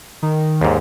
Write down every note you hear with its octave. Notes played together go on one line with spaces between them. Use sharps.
D#3
D#2 G#2